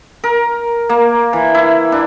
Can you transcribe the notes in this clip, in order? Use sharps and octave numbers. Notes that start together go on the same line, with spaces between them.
A#4
A#3
E3
E4
D4